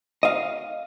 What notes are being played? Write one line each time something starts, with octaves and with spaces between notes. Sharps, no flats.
D#5 F5